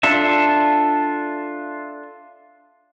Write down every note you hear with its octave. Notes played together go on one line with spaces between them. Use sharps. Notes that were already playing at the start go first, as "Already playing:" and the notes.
D4 F4 A4 E5